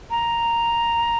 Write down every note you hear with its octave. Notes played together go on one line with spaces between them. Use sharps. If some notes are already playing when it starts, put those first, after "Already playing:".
A#5